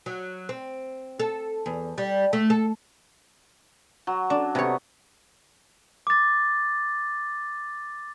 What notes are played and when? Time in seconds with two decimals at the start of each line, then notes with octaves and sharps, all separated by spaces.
0.06 F#3
0.49 C4
1.20 A4
1.66 E2
1.98 G3
2.33 A3
2.50 A4
4.07 F#3
4.30 D4
4.55 C3 B3 C#5
6.07 D6 A6